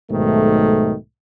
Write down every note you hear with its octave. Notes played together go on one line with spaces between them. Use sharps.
B1 G#2 D#3 A3